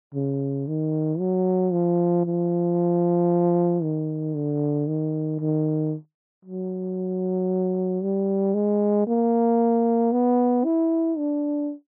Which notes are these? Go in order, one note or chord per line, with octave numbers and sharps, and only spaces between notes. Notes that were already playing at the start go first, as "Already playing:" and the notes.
C#3
D#3
F#3
F3
F3
D#3
D3
D#3
D#3
F#3
G3
G#3
A#3
B3
E4
D4